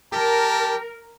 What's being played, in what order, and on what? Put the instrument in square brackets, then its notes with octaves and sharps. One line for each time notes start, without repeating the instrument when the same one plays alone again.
[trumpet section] G4 A5 [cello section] A#4